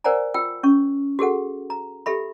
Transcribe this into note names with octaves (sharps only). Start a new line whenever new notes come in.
A#4 C5 D5 F#5 G#5 A#5
F4 G5 E6
C#4 C#6
F#4 G#4 A4 F#5
A#5
G4 A4 E5 B5